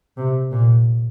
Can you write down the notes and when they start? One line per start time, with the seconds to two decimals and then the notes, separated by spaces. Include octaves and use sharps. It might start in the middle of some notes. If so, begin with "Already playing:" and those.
0.17 C3
0.51 A#2